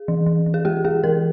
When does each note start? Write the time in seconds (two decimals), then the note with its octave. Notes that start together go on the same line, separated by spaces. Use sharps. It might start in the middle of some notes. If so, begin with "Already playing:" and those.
Already playing: G#4
0.08 E3
0.26 E3
0.46 E3
0.54 G#4
0.65 G#3 G4
0.84 G#3 G#4
1.04 E3 A#4